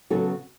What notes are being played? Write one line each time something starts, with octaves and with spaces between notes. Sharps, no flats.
C#3 F#3 B3 F#4 A4